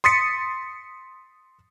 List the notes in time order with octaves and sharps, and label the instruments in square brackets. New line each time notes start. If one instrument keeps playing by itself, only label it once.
[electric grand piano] C6 D#6 A6 B6 C#7